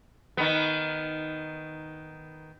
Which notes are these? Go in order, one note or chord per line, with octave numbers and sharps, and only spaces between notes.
D#3 B3